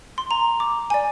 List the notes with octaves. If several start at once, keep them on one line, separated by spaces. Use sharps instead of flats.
C6
A#5
D6
D5 G#5